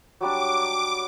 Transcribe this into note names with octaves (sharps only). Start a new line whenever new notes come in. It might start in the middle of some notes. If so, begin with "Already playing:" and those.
F#3 G3 D4 D6